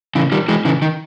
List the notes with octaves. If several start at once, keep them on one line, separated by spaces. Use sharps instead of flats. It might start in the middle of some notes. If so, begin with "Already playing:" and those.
C#3 E3
D#3 G3
E3 G#3
C#3 E3
D#3